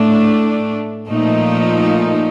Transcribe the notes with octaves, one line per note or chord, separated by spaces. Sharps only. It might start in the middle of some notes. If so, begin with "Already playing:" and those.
Already playing: A2 A3 D4
A#2 F3 A3 D#4